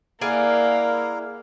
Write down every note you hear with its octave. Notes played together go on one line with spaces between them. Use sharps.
A#3 E4 G#4 A#4 D5 F5 F#5